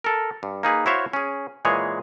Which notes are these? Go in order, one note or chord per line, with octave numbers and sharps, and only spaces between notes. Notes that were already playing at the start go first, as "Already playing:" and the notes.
A4 A#4
G2
A#3 D#4 G#4 B4
E4 F#4 C5 C#5 E5 F5
C#4 G#4
A#2 E3 G#3 G#4 C#5